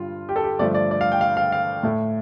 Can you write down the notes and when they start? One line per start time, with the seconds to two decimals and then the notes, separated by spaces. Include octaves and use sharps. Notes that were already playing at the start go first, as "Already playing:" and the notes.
Already playing: G2 D3 G3 F4
0.29 G4
0.36 A4
0.44 G4
0.59 G2 D3 F3 A3 D5
0.74 D5
0.91 D5
1.01 F5
1.12 G5
1.21 F5
1.37 F5
1.52 F5
1.83 A2 A3